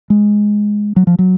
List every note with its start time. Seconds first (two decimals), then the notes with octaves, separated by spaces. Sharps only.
0.10 G#3
0.96 F#3
1.07 F3
1.19 F#3